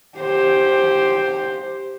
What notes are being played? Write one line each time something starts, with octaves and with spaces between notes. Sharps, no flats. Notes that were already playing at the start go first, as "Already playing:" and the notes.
G4 C5